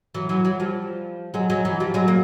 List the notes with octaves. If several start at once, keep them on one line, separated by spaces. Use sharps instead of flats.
E3 F#3
E3 F#3
E3 F#3
F3 G3
F#3 G#3
F#3 G#3
E3 F#3
F3 G3
F#3 G#3
A#3